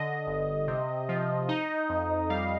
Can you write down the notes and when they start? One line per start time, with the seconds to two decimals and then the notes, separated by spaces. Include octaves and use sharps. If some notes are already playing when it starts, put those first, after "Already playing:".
Already playing: D3 D#5
0.27 G1
0.68 C3
1.09 F3
1.49 D#4
1.89 F2
2.30 G3 F5